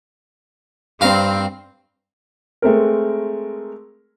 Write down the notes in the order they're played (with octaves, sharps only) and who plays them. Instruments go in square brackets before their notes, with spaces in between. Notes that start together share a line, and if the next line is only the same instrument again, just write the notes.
[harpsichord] G2 F5 A#5 [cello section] C4
[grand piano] G#3 A3 C4 A#4